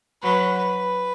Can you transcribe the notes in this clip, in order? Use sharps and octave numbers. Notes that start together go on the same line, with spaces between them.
F#3 B4
B4